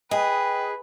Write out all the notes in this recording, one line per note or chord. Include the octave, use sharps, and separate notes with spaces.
G#4 B4 D#5 G5